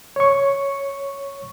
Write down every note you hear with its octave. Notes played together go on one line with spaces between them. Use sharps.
C#5 C#6